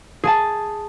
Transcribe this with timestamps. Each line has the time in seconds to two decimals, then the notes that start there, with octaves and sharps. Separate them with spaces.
0.24 G#4 G#5 A5